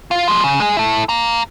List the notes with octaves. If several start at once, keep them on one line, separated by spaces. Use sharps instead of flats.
F4
F3 G#3
C#3
G#3 G#4
E4 A4
F5 A#5